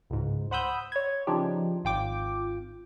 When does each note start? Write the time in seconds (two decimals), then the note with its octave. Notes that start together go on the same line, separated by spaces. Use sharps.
0.10 C#2 G#2
0.51 C5 F#5 B5 D#6 E6 G6
0.92 C#5 G#6
1.27 C#3 F3 D4 D#4 G4
1.84 G#1 F4 G5 D6